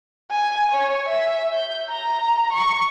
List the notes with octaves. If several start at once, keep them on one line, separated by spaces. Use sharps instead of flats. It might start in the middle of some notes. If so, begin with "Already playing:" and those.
G#5
C#5
E5
G6
A#5
C#6